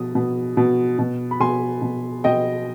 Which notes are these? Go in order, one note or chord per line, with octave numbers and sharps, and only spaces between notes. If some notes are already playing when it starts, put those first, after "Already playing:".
Already playing: B2 D#6
B2
B2
B2
B5
B2 G#5 C6
B2
B2 D#5 G5